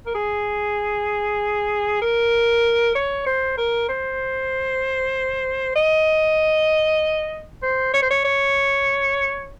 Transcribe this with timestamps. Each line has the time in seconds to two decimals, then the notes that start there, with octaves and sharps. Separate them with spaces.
0.06 A#4
0.15 G#4
2.02 A#4
2.95 C#5
3.26 C5
3.58 A#4
3.89 C5
5.76 D#5
7.63 C5
7.94 C#5
8.02 C5
8.11 C#5
8.25 C#5